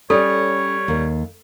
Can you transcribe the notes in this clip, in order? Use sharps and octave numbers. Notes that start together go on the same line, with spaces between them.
G3 C#4 A4 C#5
D#2